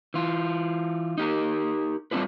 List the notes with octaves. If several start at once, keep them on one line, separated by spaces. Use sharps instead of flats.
E3 F4
D#4 G4 A#4
G3 A3 C4 D4 F4 B4